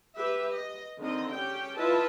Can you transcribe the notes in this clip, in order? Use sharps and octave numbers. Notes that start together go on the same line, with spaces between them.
G4 B4 E5
D#5
D3 D#3 C4 D#5
C#4 G4 G5
E4 F4 B4 D#5 E5 A5